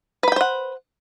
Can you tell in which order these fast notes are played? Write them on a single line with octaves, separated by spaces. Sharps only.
B4 B5 G5 C5 F#5